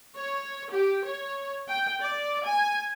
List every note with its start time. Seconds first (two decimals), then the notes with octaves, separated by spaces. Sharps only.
0.16 C#5
0.72 G4
1.05 C#5
1.69 G5
2.02 D5
2.45 G#5